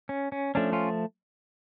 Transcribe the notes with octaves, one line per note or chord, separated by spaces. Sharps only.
C#4
C#4
F3 A3 C#4 D4
C#4 F4